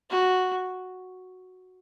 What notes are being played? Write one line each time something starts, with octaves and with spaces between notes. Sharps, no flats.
F#4